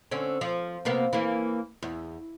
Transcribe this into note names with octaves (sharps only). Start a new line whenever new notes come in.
D3 C4 C#4
F3
C3 A#3 B3
E3 A#3
E2